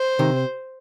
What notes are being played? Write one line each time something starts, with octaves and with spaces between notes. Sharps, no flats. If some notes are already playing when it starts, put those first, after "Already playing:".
Already playing: C5
C3 D#3